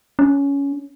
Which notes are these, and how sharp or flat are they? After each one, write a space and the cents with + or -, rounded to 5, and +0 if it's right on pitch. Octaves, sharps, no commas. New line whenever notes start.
C#4 +15